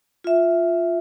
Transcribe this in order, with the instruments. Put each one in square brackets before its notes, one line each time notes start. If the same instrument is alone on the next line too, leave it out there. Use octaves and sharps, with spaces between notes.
[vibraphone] F4 E5